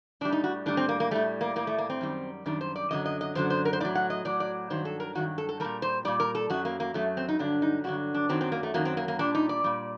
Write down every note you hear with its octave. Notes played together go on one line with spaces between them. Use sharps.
A2 G3 D4
D#4
F#4
A2 G3 D4
C4
A#3
A#3
A2 G3 A3
A#3
A2 G3 A#3
A3
A#3
C4
F#2 D#3 G3
F#2 D#3 G3 D4
C5
D5
F#2 D3 F#3 D#5
D#5
D#5
F#2 D3 F#3 C5
C5
A#4
C5
A2 F#3 D5
F#5
D#5
A2 F#3 D5
D5
G2 D#3 F#3 C5
A4
A#4
G2 D#3 F#3 F#4
A4
A4
A#2 G3 A#4
C5
A#2 G3 D5
A#4
A4
F#2 F#3 F#4
A#3
A#3
F#2 F#3 A3
C4
D#4
G2 D3 F#3 D4
D#4
G2 D3 F#3 F#4
D4
F#2 D#3 F#3 C4
C4
A#3
A3
F#2 D#3 F#3 A#3
C4
A#3
A#3
A#2 G3 D4
D#4
D5
A#2 G3